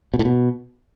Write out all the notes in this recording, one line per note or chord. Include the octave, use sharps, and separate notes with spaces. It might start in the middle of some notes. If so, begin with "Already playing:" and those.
B2
A2
B2